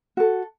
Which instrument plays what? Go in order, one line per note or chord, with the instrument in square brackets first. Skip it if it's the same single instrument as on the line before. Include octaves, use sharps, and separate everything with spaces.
[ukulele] F#4 A4